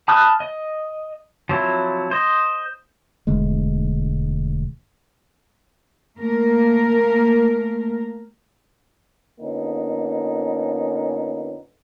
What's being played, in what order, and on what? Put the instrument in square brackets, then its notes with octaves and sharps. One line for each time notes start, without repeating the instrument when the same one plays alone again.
[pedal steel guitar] A5 B5 D#6 F6 F#6
D#5
F3 F#3 C4 E4
C5 D#5
[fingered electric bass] E1 D2 G#3
[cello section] A3 A#3 A#4
[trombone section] F2 D3 A#3 B3 C#4 D#4